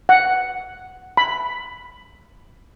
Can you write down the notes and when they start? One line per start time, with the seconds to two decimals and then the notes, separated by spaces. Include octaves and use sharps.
0.09 F#5
1.17 B5